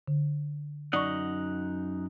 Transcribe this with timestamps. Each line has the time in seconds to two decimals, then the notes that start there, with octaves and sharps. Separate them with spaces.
0.08 D3
0.93 F#2 D#4 D5 F#5 C#6